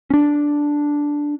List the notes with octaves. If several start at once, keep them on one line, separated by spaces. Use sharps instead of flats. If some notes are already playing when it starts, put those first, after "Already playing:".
C#4 D4